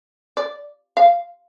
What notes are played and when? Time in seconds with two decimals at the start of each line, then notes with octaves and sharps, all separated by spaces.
0.37 D5
0.97 F5